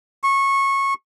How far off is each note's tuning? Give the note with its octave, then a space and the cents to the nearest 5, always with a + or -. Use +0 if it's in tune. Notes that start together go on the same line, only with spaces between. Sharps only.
C#6 -20